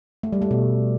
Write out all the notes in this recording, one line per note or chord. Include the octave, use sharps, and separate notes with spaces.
A3
G3
A3
B2